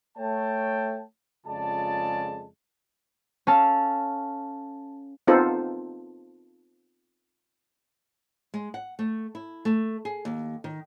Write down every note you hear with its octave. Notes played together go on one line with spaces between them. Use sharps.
A3 C#5 G5 A5
F2 C#3 G#3 F4 D5 A5
C#4 A4 F5 A5
B3 C4 D#4 F4 A4 C5
G#3
F#5
A3
E4
A3
G#4
D#2
D#3